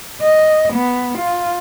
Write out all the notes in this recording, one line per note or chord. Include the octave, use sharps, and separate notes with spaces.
D#5
B3
F4